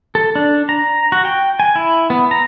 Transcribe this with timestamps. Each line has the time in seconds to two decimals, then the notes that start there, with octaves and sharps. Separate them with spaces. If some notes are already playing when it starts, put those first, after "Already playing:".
0.15 A4
0.36 D4
0.69 A#5
1.12 F#4
1.25 G5
1.60 G#5
1.76 E4
2.10 B3
2.31 A#5